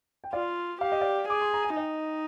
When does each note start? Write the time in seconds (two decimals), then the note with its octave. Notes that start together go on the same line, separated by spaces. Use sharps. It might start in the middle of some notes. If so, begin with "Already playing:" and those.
0.24 G5
0.33 F4 D5 F5
0.81 G4 F5
0.92 D#5
1.01 D5 F5
1.28 G#4 D6
1.41 C6
1.54 A#5
1.64 G#5
1.76 D#4 D#5 G5